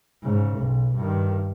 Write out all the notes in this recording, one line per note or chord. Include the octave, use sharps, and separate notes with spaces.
G#2 C#3
B1
G2 D#3